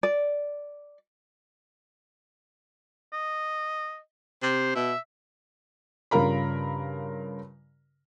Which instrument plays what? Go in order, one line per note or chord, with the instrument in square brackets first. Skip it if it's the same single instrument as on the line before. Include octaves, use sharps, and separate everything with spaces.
[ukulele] D5
[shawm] D#5
[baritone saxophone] C3 [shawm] C5
[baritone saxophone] B2 [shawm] E5
[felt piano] G2 C#3 F4 A#4 A#5 B5